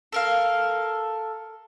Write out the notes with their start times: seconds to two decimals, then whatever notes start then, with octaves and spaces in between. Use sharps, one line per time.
0.12 A4 A#4 F5